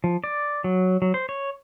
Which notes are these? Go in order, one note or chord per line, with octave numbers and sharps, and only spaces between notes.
F3
D5
F#3
F#3
C5
C#5